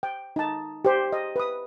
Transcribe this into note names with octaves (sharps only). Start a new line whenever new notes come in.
G5
D#4 A5
G4 C5
D#5
B4 D#6